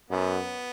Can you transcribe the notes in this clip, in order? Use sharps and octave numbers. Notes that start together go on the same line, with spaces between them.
F#2 B3